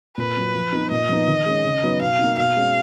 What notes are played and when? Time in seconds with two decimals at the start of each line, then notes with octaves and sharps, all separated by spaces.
0.17 A#2 B4
0.36 F#3 A#3
0.55 F3
0.73 B3 D#4
0.91 A#2 D#5
1.09 F3 B3 D#4
1.28 D#3
1.46 G#3 C#4
1.65 C#3
1.83 F#3 B3 D#4
2.01 B2 F5
2.19 D#4
2.24 A#3
2.37 B2 F5
2.56 G#3 C#4